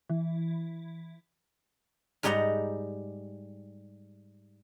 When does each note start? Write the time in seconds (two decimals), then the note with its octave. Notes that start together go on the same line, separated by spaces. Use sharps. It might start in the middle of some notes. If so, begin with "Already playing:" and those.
0.09 E3
2.23 G#2 G3 D#4 G4 F#5 A#5